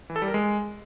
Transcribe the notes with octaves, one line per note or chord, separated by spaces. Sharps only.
E3
A4
G3
A#4
G#3